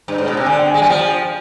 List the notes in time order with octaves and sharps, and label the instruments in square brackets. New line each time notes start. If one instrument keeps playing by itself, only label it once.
[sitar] G2
G#2
B2
C3
[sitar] D3 [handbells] G#5
[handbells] G5
G#5
[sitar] G#3
[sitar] G3 [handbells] G#5
[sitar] F3 [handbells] G5